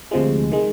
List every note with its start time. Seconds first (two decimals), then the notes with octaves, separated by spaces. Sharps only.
0.11 D2 C3 F3 G#3
0.52 D#3 G#3